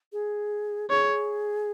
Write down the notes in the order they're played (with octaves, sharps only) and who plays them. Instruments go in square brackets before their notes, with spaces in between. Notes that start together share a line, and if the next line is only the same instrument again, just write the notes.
[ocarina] G#4
[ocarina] G#4 [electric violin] C#5